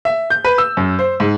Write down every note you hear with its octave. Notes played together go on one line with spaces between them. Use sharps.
E5
G6
B4
E6
F#2
C5
G#2